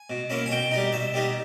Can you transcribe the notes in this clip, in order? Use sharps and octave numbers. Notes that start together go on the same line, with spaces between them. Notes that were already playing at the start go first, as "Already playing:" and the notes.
Already playing: G#5
B2
A#3 C#4 E4
G#5
B2 G5
G3 B3 D#4
B2 E5
G3 B3 D#4